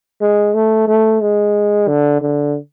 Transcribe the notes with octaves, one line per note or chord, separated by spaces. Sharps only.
G#3
A3
A3
G#3
D3
D3